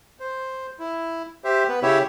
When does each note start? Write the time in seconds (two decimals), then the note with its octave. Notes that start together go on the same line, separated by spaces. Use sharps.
0.20 C5
0.79 E4
1.44 G4 C5 E5
1.69 B3 B4
1.82 C#3 E4 G4 C#5 E5